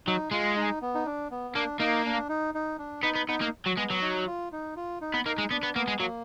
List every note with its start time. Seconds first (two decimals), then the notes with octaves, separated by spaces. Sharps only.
0.07 F#3 D#4
0.31 G#3 F4
0.57 D#4
0.82 B3
0.95 D#4
1.06 D4
1.31 B3
1.55 A#3 D4
1.80 A#3 D#4
2.05 D4
2.29 D#4
2.54 D#4
2.79 D4
3.03 B3 D#4
3.15 B3
3.28 B3 D#4
3.41 A#3
3.66 F#3
3.77 G#3 B3
3.90 F#3
4.02 D#4
4.27 F4
4.52 D#4
4.76 F4
5.01 D#4
5.14 B3
5.25 A#3 D#4
5.38 G#3
5.51 B3 D4
5.63 B3
5.75 A#3 B3
5.88 G#3
6.00 F#3 A#3